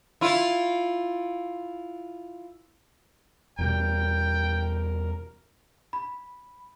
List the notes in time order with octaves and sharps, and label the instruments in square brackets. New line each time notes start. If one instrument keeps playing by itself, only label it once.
[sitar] E4 F4
[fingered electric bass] E2 B2 G3 [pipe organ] A#4 [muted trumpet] G5
[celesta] B5